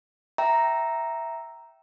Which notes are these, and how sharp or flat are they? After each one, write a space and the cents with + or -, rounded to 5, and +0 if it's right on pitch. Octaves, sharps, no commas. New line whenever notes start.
E5 +0 G5 -20 A#5 +0